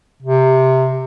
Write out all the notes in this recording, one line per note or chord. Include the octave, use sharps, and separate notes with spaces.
C3